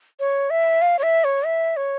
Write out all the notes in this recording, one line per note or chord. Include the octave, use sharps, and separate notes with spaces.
C#5
E5
F5
C#5
E5
C#5
E5
C#5